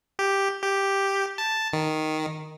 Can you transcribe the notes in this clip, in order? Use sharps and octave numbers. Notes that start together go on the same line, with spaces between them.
G4
G4
A5
D#3